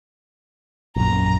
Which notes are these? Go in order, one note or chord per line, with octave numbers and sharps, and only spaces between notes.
A#1 F#2 A#5